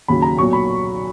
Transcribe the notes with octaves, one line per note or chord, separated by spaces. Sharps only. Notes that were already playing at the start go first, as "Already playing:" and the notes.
D#2 C#3 F#3 B5
A#5
B1 A#2 F#3 C#6
B5